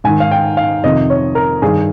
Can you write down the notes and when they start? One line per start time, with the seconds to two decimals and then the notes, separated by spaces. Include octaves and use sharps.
0.04 G#2 D#3 G#5
0.20 F5
0.31 G5
0.57 F5
0.83 F2 C3 D#3 D#5
1.10 C#5
1.35 A#4
1.62 G2 D#3 G#4